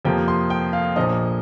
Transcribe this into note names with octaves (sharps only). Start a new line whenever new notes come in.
F2 C3 F3 A#3 G5
C6
G5
F5
A#1 A#2 F3 A#3 D#5